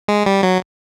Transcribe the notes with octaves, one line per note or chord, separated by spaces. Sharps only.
G#3
G3
F#3